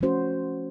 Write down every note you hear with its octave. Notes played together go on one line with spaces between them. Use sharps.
F3 A3 C#4 F#4 C5